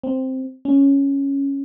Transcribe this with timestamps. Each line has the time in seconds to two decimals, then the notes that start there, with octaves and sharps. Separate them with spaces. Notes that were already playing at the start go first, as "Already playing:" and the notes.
0.03 C4
0.65 C#4